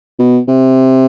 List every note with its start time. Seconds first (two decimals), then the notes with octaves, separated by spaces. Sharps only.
0.19 B2
0.48 C3